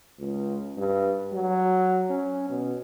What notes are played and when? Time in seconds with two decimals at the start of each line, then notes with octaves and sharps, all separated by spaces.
0.19 C#2
0.78 G2
1.33 F#3
2.10 C#4
2.50 B2